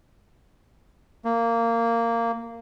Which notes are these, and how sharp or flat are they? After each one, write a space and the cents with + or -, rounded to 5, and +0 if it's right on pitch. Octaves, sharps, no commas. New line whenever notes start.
A#3 -15